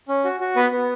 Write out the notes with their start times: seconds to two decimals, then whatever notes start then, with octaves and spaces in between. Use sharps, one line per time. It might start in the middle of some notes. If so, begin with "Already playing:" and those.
0.08 C#4
0.25 F#4
0.40 F#4
0.56 B3 B4
0.72 B3